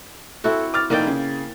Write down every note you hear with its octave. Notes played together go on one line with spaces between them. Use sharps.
C4 E4 F#4 A4
D6 F6 A6
F1 A#3 D#4 G5 A6
C#3